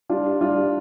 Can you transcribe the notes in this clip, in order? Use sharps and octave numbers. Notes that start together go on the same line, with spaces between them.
G3 D4 F4
G3 D4 F4